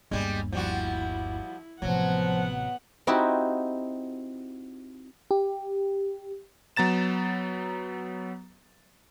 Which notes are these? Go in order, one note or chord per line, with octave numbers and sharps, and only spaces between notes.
G1 D#2 G3 G#3
F3 G3 E4 F#4
A1 C3 F3 F#3 B3 F#5
C4 D#4 E4 F#4 G4
G4
F#3 B3 A#5 A6 E7